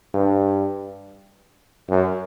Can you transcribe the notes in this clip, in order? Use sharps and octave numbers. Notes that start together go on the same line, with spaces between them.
G2
F#2